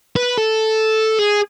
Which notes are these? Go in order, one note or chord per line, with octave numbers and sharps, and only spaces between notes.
B4
A4
G#4